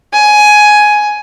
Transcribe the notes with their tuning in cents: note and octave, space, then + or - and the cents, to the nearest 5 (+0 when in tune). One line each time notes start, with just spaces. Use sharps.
G#5 +10